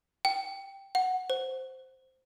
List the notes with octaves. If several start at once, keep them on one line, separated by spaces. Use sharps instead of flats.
G5
F#5
C5